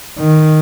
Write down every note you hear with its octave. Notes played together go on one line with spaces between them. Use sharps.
D#3